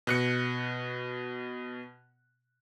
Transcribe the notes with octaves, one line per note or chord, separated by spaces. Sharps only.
B2 F#6 C#7